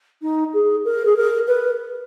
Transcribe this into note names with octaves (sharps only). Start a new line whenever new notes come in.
D#4
G#4
A#4
G#4
A#4
B4